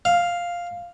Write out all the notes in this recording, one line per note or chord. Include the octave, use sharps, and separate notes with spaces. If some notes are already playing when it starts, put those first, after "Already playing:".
F5